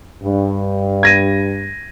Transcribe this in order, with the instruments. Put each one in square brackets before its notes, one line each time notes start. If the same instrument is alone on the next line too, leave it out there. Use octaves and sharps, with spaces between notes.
[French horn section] G2
[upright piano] G#6 A#6 D#7